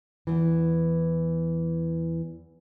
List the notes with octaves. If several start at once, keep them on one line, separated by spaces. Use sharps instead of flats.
E2 E3